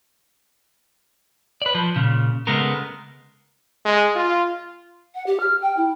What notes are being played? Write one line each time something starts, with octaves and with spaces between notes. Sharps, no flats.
B4 D5
F3
A#2 C#3
C#3 G#3 A3 B3 A#4
G#3
F4
F#5
G4
F6
G5
E4